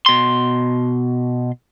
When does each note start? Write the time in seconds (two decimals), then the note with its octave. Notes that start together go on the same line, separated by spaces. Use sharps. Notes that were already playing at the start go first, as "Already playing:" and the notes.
0.06 B2 C6